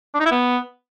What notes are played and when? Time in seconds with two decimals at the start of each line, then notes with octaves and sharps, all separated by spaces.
0.15 D4
0.20 D#4
0.26 E4
0.32 B3